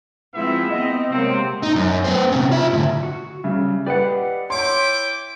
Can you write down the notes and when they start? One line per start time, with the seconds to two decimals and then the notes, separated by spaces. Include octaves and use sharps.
0.34 F3 G#3 B3 C4 E4 E5
0.71 B3 C4 D#5
1.11 C3 F#3 G#3 A#3 C4
1.63 D#4
1.76 F#2
2.04 B3 C5
2.32 C3 C#4
2.52 F4 E5
2.73 A2 D3
3.03 F#4
3.44 C#3 G3 E5
3.86 G4 B4 D5 D#5 F#5
4.50 E4 C#5 G5 C6 D6